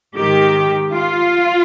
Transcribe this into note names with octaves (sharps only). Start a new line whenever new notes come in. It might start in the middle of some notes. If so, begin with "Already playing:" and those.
G#2 D#3 G4
F4